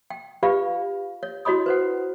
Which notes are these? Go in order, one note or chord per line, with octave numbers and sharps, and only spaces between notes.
G5
F4 G4 B4 D5 F5 B5
C#5
E4 F#4 C#5 D#5 B5 D#6
B4 C5 F#5